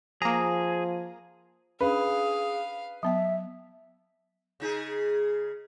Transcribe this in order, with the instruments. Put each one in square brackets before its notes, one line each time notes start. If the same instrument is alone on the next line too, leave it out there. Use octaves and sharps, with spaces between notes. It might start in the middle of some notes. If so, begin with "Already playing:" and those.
[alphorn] F3 [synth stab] A#3 A#5 [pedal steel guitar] G#4
[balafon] C#4 D4 [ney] G#4 [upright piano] B4 [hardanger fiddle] F5
[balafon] F#3 B3 G5 [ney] E5
[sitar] C#3 D#4 G#4